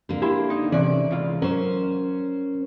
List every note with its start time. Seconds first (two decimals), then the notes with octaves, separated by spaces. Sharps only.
0.09 D3 A#3
0.22 E4 G4 A5 C6
0.50 D#4
0.72 C3 E3 C#4 D5
1.11 C#2 F4
1.42 F#3 C#4 A#4 C5